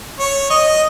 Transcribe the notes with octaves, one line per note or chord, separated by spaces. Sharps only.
C#5
D#5